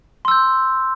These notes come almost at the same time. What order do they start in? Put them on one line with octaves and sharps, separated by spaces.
C6 E6 G6